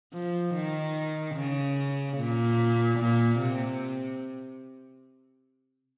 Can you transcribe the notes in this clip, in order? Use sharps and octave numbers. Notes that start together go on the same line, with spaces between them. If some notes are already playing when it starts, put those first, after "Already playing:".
F3
D#3
C#3
A#2
A#2
C3